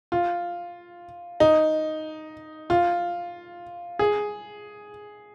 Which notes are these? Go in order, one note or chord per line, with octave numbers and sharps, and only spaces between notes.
F4
D#4
F4
G#4